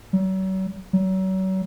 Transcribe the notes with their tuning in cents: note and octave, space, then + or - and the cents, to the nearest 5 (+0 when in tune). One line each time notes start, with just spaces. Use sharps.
F#3 +40
F#3 +35